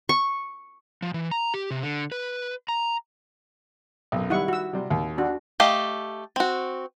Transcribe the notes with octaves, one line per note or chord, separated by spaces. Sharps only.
C#6
F3
E3
A#5
G4
C3
D3
B4
A#5
B1 F#2
D#3 G3 E4 F#5 C#6
F#4 E6
C3 G3
D#2
D4 F#4
A3 G4 D#5 F5
C4 F#4